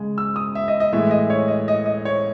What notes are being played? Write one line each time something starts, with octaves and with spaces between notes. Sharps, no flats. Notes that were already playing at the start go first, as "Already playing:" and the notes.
Already playing: C#3 G#3
E6
D#6
E5
D#5
D#5
A2 E3 G#3 E5
D#5
C#5
D#5
D#5
D#5
C#5